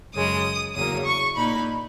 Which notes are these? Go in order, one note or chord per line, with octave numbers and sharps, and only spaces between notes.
F#2 C#3 G#3 D#6
E2 C#3 F#3 A#3 D#6
C#6
A#2 A#3 D#4 B5